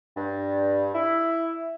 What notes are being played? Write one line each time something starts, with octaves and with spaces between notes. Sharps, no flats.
G2
E4